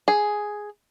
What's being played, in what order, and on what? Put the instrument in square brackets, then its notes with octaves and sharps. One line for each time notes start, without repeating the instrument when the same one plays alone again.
[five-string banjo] G#4